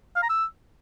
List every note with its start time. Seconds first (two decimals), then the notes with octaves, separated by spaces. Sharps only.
0.16 F5
0.23 A#5
0.30 E6